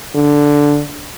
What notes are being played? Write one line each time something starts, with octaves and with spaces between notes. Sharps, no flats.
D3